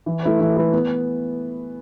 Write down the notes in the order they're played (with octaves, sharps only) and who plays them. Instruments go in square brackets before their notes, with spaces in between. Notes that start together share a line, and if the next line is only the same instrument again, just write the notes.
[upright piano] E3
A3 E4 B4
E3
A3 E4 B4
B3